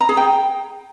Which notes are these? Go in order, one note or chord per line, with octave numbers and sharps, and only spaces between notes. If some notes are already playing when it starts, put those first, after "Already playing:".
A#5
G#4
G5